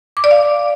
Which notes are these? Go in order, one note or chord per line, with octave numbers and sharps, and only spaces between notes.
D6
D5
F5